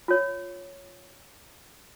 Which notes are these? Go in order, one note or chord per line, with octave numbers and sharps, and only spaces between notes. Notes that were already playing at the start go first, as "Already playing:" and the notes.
F4 C#5